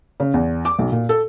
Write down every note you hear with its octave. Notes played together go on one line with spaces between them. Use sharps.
C#3
E2
D6
B1
A#2
A4